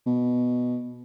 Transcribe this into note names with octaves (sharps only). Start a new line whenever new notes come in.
B2